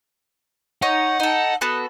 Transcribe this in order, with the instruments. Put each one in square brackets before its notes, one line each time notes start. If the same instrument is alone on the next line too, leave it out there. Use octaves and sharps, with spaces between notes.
[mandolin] D#4 C#5 [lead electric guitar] F#5
[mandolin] D#4 A4
B3 F#4 A4